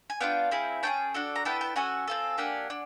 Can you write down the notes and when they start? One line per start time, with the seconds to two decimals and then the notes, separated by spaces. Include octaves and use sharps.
0.10 G#5
0.20 B3 D4 F4 F5 G5
0.51 C4 E4 G#4
0.83 C#4 F4 G#4 G5 A5
1.14 D4 F#4 A4
1.36 A#5
1.45 B3 E4 A4 G5 A5
1.61 G5 A5
1.76 C#4 F#4 A4 F#5 G#5
2.08 C4 F4 A4
2.37 A#3 D4 G4 F#5 G#5
2.70 D4